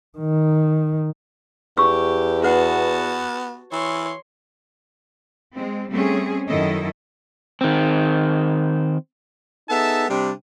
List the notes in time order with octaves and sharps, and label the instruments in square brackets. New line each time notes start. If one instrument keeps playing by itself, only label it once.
[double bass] D#3
[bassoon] E2 [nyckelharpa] G4 [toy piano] C#6 E6
[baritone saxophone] B3 [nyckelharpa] F#4 A5 [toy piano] B4 F#5
[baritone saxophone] E3 [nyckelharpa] C#5 C6
[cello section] G#3 C4
G3 A3 C4 C#4 G#4
F#2 D#3 E4 A4 D#5
[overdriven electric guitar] D#3 C4
[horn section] B3 D#4 G#4 A4 E5 A5
C3 G3 C4 D4